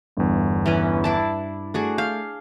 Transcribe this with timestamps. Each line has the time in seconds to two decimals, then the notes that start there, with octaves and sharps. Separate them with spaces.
0.17 G1 E2 G2
0.66 E3 C#4 B4
1.04 D4 E4 A5
1.74 A3 D4 F#4 G#4
1.98 F5 G6